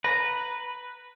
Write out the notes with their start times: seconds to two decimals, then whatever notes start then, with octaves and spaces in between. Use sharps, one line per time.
0.04 B4 A#5